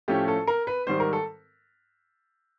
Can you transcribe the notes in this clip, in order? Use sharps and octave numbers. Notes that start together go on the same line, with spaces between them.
A2 F3 A3 C#4 G4
A4
A#4
B4
G#2 D#3 G3 C5
A#4
A4